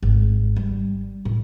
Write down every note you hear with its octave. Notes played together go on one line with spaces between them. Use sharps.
G#1
G3
A2